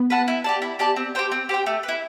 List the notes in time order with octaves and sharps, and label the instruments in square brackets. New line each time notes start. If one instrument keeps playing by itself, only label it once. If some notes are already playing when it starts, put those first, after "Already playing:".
Already playing: [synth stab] B3
[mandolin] B4 F#5 A5
E4
G4 D5 A5
E4
G4 D5 A5
C4
G4 C5 G5
C4
G4 C5 G5
A3
B4
E4